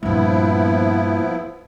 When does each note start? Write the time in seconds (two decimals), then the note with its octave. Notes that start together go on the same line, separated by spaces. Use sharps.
0.03 G2 A#2 F3 B3 E4